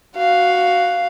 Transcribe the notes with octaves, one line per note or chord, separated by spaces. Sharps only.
F#4 F5